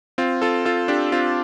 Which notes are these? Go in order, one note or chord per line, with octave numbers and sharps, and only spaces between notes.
C4 F4
F4 A4
F4 A4
D4 G4
C4 F4